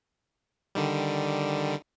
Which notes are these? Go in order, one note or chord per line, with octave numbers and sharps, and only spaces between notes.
D3 D#3 G3